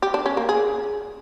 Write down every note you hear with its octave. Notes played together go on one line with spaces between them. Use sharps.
G4
D4
C#4
A#3
G#4